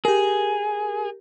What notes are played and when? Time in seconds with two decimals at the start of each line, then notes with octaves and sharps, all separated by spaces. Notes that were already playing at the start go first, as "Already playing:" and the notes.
0.05 G4 G#4 A#4